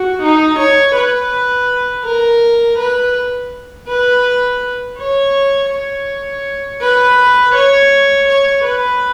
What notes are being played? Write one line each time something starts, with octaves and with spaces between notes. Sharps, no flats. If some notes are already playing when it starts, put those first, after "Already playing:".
Already playing: F#4
D#4
C#5
B4
A#4
B4
B4
C#5
C#5
B4
C#5
C#5
B4